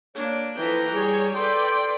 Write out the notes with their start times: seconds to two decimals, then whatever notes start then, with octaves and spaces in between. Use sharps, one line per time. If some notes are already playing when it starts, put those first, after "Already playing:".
0.15 A#3 D4 C#5
0.57 E3 F3 A4 B4 G5 A#5
0.93 G3 G#4 C#5
1.35 A4 B4 D5 G5 C6